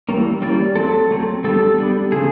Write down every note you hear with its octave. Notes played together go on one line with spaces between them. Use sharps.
E3 G3 A#3 C#4
E3 G3 A#3 C#4 D5
F#3 A3 C4 A4
F#3 A3 C4
G3 B3 D4 A4
G3 B3 D4
C#3 F3 A3 G#4